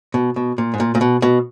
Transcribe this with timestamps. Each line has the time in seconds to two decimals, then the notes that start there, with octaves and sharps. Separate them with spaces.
0.14 B2
0.36 B2
0.58 A#2
0.74 G#2
0.80 A#2
0.95 A#2
1.01 B2
1.22 B2